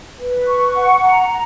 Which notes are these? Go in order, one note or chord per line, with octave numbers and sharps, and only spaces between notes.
B4
C#6
F#5
A#5